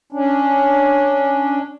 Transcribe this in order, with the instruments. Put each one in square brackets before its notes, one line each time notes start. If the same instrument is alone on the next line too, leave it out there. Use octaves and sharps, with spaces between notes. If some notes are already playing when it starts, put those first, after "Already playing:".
[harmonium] C#4 D4